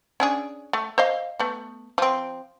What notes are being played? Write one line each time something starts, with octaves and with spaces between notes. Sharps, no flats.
C#4 D4 G#4
A3
C5 D#5 F5
A3 B3
F3 C4